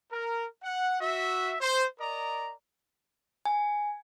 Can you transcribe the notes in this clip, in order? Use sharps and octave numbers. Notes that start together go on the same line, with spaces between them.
A#4
F#5
F#4 E5
C5
A#4 D5 D#5 A#5
G#5